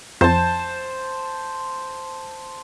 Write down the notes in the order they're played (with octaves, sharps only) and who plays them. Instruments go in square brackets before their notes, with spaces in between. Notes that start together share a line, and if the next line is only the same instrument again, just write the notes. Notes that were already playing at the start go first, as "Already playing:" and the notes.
[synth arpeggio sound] F2 [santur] C5 A5